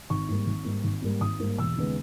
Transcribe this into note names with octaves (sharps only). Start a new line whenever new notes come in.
G#1 C#6
G#2 G3 A#3
G#1
G#2 G3 A#3
G#1
G#2 G3 A#3
G#1 D#6
G#2 G3 A#3
E1 E6
D#2 C#3 G#3 B3